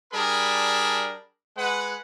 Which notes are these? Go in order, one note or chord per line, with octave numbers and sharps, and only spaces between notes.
G3 D4 G#4 A#4 A5 B5
G#3 B4 F#5